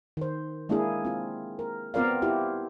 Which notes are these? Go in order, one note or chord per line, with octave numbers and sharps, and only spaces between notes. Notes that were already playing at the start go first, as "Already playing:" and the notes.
D#3 C5
G#3 A#3 D4 E4 G#4
C4 F4
A#4
B3 C4 F4 A#4 D5 F5
E4 F4 G4